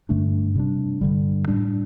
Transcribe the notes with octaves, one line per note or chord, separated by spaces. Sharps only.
G2 D3 A3 D4
C3 G3 D4
G2 D3 G3
A2 G3 D4